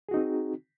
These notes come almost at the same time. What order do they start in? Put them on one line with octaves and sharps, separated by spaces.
G#4 F#4 D#4 C4